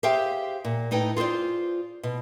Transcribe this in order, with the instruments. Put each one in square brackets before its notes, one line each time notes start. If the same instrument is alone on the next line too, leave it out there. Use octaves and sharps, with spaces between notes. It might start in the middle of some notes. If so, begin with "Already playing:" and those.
[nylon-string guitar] G4 G#4 C5 E5 F5 G5
A#2
A2 D#4 B4 G5
F4 G#4 B4 C5 D5
B2